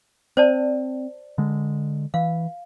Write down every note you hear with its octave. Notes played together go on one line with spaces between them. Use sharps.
C4 C5 D5 A5
D3 G#3
E3 F5